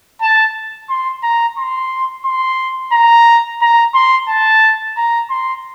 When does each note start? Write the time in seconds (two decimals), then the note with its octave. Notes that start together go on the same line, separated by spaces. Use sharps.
0.21 A5
0.89 C6
1.23 A#5
1.58 C6
2.25 C6
2.93 A#5
3.62 A#5
3.94 C6
4.28 A5
4.97 A#5
5.30 C6